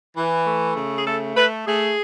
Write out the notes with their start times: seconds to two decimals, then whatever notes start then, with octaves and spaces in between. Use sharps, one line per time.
0.16 E3
0.46 A3
0.76 C#3
0.97 G#4
1.06 A3 A4
1.36 A3 B4
1.66 A3 G#4